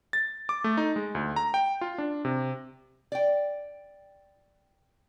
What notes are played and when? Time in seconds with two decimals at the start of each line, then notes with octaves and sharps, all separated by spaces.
0.13 A6
0.49 D6
0.64 A3
0.77 D#4
0.96 G#3
1.15 D2
1.36 A#5
1.54 G5
1.81 F4
1.98 D4
2.25 C3
3.12 D5 G5